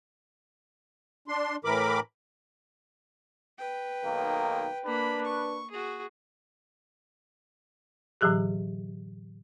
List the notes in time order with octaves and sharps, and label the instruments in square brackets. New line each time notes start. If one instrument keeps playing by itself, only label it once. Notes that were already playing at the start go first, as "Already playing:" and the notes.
[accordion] D4 C6
A2 E3 A#4 B5 D6
[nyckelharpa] B4 G5
[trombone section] B1 D#3 A#3
[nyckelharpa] A#3 B5 [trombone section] D4 B4
[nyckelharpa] C#6
F#4 G#4
[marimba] A2 D3 E3 F#3 G4 G#4